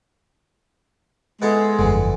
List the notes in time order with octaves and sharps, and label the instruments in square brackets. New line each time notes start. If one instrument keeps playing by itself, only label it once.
[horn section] G#3 [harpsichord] B3 E4 A4
[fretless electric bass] G1 F2 [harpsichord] D3 E3